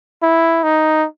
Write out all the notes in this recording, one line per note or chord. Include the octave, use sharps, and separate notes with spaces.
E4
D#4